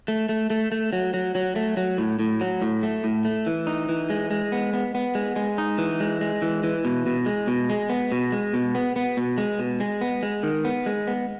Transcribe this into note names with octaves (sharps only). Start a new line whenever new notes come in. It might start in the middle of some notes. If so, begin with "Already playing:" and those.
A3
A3
A3
A3
F#3
F#3
F#3
A3
F#3
A2
A2
F#3
A2
A3
A2
A3
E3
D#4
E3
G#3
G#3
B3
B3
B3
G#3
G#3
D#4
E3
G#3
G#3
E3
E3
B2
B2
G#3
B2
G#3
B3
B2
G#3
B2
B3
B3
B2
G#3
B2
G#3
B3
G#3
D#3
B3
G#3
B3